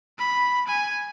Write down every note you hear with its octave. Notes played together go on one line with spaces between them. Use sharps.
B5
G#5